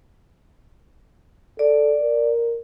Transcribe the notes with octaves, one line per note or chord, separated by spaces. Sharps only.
A4 D5
A#4